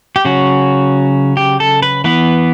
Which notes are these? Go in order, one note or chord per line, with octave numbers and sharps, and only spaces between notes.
G4
C#3 F#3 C#4 F#4
G4
A4
B4
E3 B3 B4